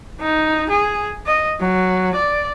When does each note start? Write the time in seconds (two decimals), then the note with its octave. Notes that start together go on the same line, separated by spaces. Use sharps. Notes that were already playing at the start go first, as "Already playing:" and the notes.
0.20 D#4
0.69 G#4
1.26 D#5
1.60 F#3
2.15 D5